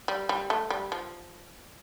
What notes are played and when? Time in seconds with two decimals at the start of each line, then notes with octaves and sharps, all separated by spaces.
0.08 G3
0.29 G3
0.50 A3
0.70 G3
0.92 F3